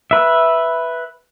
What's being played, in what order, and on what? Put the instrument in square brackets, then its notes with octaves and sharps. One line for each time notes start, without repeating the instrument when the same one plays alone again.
[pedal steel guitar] B4 E5